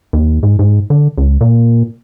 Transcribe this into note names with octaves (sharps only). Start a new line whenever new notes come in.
D#2
G#2
G#2
D3
C#2
A#2